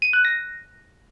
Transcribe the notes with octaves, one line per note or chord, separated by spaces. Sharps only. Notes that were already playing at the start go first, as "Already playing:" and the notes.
D#7
F#6
A#6